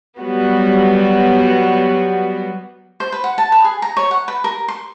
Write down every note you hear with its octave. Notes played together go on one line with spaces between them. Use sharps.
F#3 G3 B3 F#4
C5
B4
F#5
A5
B4
G#4
A#5
C#5
F#5
B4
A#4
C6